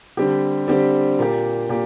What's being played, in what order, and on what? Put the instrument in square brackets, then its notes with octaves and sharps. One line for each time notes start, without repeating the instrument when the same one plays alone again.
[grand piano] D3 G3 C4 G4
D3 G3 C4 G4
A#2 A#3 G4
A#2 A#3 G4